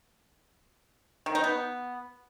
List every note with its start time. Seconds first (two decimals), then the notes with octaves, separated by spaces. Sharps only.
1.26 D#3
1.35 D#4
1.44 B3